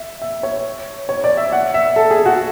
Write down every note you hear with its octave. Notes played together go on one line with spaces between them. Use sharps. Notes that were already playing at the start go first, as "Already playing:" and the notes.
Already playing: E5
E5
C#5
C#5
D5
E5
F#5
E5
A4
G#4
F#4